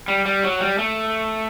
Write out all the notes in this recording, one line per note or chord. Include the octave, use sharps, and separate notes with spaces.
G3
G3
F#3
G3
A3